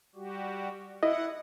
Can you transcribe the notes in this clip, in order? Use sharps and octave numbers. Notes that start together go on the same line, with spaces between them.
G3 F#4 G4
E4 D#5 F#5